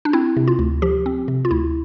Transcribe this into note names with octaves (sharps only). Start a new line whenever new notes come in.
D4
C4 E4
C3
F4
D2
F3 G4
C4
C3
F4
D2 E4